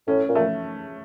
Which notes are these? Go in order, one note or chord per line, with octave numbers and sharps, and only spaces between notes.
A2 C#4
A#2
A3